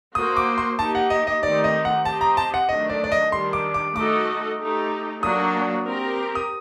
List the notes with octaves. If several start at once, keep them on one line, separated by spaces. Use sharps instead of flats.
A#3 F#4 C5 D#6
D6
C6
A#3 D#4 G4 A5
F#5
D#5
D#5
D#3 A3 C4 D#4 G4 D5
D#5
F#5
C4 G4 C5 D#5 A5
A#5
A5
F#5
D#3 F#3 A3 D4 D#5
D5
D5
D#5
D#3 G3 D4 G4 C6
D6
D6
A3 D#4 F#4 A4 D#5 D6
A3 D#4 G4
F#3 A#3 D4 F#4 D#6
C4 G4 A#4
D#6